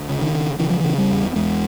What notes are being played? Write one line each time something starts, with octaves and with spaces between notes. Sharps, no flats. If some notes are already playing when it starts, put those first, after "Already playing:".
Already playing: D2
C#3
D#3
C#3
C#3 E3
F3
C#3 E3
G3
E2
E2 G#3